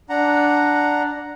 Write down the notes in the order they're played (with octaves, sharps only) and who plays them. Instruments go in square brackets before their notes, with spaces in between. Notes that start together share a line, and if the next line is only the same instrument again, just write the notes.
[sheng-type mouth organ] D4 F#5 A#5